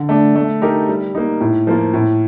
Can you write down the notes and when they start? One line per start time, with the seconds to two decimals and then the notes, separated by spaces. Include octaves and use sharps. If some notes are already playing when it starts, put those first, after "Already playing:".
Already playing: D3
0.09 A3 D4
0.35 A3
0.62 D#4 G4 A#4
0.88 G3
1.15 A#3 D#4
1.41 A2
1.67 F3 A#3 F4
1.94 A2